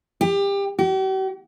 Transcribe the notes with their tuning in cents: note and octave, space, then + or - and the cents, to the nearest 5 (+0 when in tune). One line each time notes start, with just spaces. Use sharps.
G4 +25
G4 -45